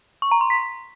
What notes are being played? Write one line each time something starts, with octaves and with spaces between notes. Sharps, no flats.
C#6
A#5
C6
B6